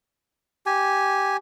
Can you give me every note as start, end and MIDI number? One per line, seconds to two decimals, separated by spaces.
0.66 1.37 67
0.66 1.37 80